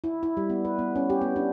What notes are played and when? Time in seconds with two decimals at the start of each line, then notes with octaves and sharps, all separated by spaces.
0.04 E4
0.23 E4
0.37 G3
0.50 B3
0.65 B4
0.79 B3
0.96 C#4
1.10 G4
1.21 B3
1.36 D4